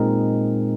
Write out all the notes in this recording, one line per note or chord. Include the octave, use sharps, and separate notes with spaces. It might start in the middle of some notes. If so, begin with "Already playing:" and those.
Already playing: A#2 G#3 C4 D#4 A#4